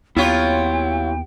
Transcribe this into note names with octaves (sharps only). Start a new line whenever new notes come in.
D#2 F#3 B3 E4 F4 G4 C#5 G5